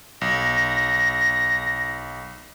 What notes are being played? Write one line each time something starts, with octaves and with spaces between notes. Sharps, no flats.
B1 A#6